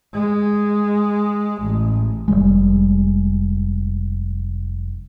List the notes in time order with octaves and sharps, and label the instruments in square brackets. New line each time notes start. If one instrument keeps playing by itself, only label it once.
[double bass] G#3
A1
[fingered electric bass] F1 E2 G3 G#3